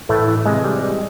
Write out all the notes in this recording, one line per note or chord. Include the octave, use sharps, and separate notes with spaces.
A2 E3 A3
E3
C3 G#3
G3
G3